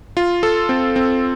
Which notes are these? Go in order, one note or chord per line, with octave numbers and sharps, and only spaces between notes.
F4
A4
C4
C4